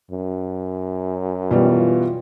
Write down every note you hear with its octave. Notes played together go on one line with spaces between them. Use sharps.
F#2
B2 E3 G3 F4